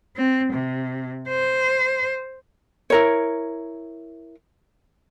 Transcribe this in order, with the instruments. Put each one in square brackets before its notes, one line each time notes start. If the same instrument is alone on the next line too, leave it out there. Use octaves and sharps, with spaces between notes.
[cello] C4
C3
C5
[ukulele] E4 A#4 C#5